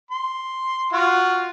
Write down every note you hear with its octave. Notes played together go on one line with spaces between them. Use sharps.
C6
F4 F#4